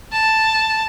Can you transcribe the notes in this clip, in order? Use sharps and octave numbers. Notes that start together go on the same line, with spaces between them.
A5